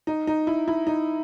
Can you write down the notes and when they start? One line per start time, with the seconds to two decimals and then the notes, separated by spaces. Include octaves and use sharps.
0.07 D#4
0.27 D#4
0.47 E4
0.68 E4
0.87 D#4